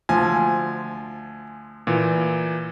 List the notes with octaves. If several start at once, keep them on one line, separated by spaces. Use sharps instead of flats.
D2 F3 G#5
A#2 E3